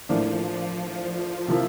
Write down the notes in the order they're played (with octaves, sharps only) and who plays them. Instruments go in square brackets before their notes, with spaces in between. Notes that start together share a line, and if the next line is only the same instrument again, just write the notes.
[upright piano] A2 E3 A#3 D4 [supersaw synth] F3
[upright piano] C3 F3 A#3 E4